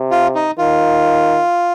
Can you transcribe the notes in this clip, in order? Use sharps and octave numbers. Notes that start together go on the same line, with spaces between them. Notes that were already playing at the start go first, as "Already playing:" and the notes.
Already playing: C3
F4
D#4
D#3 F4